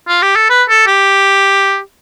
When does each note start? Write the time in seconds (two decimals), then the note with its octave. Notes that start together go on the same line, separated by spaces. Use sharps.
0.08 F4
0.22 G4
0.35 A4
0.50 B4
0.69 A4
0.87 G4